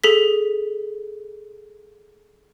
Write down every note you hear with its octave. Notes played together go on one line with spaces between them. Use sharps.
G#4 A4 B6